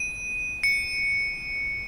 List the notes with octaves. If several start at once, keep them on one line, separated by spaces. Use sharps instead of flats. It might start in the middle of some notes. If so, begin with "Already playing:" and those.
Already playing: D#7
C#7